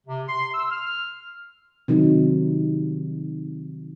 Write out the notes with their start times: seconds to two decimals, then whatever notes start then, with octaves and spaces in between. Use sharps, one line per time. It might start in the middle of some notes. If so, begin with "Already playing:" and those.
0.07 C3
0.28 C6
0.54 E6
0.71 F6
1.88 C3 D#3 F#3 D#4